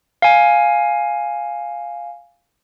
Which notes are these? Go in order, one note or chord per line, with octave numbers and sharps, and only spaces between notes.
F5 G#5